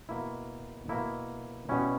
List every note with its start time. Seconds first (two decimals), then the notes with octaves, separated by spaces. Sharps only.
0.09 B2 A#3 E4
0.89 B2 A#3 E4
1.69 B2 G3 C#4 E4